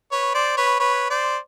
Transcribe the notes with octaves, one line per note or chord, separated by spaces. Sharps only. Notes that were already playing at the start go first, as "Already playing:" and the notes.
B4 C#5
C5 D5
B4 C#5
B4 C#5
C5 D5